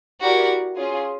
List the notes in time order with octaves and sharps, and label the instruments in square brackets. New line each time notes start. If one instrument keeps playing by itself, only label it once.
[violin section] E4 G4 A#4 D5 [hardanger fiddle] F#4
[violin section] C#4 F4 G#4